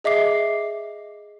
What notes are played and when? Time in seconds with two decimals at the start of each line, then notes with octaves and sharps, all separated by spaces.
0.04 G#4 D#5 E5 D6 C7